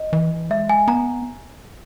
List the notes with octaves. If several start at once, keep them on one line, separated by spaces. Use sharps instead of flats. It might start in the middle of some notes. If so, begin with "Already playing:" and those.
Already playing: D#5
E3
G#3 E5
G#5
B3 A#5